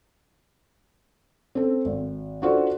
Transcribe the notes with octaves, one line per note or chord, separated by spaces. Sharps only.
C4 A4
G#1
D4 F4 F#4 A4 C5 D5